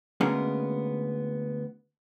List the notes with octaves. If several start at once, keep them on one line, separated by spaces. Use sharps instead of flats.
D2 G#3 A#3 B3 C#4